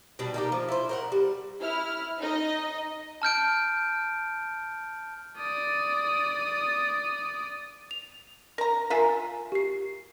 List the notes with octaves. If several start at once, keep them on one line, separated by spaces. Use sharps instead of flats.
B2 G3 D4
D#3 A#3 G4
F3
E4 C5
A#4 C5 F#5
G3
E4 F6
D#4 D#5
A5 F6 G6 D7
D5 D#6
F7
A#4 A#5
F4 A#4 E5 F5 G#5 A#5
G4 C7